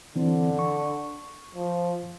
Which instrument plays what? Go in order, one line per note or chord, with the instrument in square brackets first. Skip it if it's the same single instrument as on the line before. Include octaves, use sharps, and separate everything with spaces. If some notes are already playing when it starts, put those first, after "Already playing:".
[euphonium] D3 [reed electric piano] E3 C4
[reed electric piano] C#6
[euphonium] F3